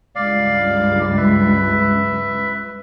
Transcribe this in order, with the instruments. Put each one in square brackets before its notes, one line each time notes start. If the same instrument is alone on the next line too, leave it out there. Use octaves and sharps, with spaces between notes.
[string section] C#2 G2 [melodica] D5 F5
[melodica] B4 E5